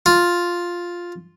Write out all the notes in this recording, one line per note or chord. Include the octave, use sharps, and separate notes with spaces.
F4